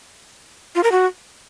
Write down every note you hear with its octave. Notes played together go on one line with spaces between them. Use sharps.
F4
A#4
F#4